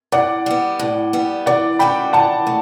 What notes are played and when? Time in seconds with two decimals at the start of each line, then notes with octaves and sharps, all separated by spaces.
0.12 A2 D5 F#5
0.46 G3 B3
0.79 A2
1.13 G3 B3
1.46 E3 D5 F#5
1.79 A3 C#4 F#4 A4 G5 B5
2.13 E3 F#5 A5
2.47 A3